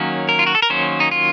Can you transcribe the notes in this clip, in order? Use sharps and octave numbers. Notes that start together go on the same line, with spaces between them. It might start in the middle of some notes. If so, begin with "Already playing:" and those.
Already playing: D#3 F#3 A#3 C#4
A#4
F4
F#4
A4
A#4
D#3 F#3 A#3 C#4 C5
D#4
F4